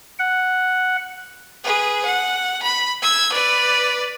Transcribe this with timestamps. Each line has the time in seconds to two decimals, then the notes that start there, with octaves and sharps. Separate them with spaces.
0.19 F#5
1.64 G#4 B4
2.05 F#5
2.63 B5
3.02 E6 G#6
3.32 B4 D5